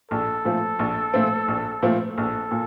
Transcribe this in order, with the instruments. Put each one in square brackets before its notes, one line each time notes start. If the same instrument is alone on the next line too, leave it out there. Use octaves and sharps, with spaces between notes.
[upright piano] A#1 [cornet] A4
[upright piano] A#2 F3 A3 C4
A#1
A#2 F3 A3 C4
A#1
A#2 F3 A3 C4
[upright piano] A#1 [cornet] A4
[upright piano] A#2